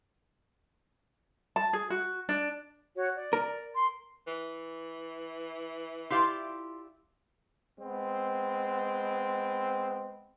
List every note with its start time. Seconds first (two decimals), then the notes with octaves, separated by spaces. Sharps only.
1.56 A5
1.73 G#4
1.90 F#4
2.29 D4
2.95 F#4 C#5
3.15 D5
3.33 A#4
3.75 C6
4.27 E3
6.10 E4 F4 G4 D5 F5 C6
7.80 G#3 B3 C4